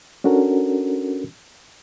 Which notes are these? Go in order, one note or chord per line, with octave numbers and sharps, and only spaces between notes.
C#4 D4 F#4 A4 A#4